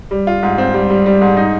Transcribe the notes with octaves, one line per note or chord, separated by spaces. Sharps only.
G3
F4
G#2
C4
G3
G3
G3
G#2
D#4